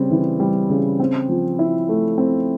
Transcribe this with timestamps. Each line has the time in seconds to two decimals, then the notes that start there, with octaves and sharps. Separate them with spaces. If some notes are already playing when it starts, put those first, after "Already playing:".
Already playing: C#3 G3 C4
0.10 E3
0.40 G3
0.70 C#3
1.00 C4
1.29 F3
1.59 E4
1.89 A3
2.18 C4